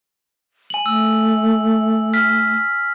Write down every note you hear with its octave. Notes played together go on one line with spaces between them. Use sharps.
G#5 F#7
A3 E6
F6 B6